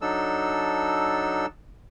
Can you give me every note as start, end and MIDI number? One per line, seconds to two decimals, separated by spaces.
0.01 1.46 54
0.01 1.46 62
0.01 1.46 63
0.01 1.46 69
0.01 1.46 88